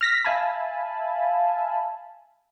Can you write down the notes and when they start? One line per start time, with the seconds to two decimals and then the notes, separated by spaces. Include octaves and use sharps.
0.01 F6 A#6 B6
0.25 E5 F5 G#5 A5 B5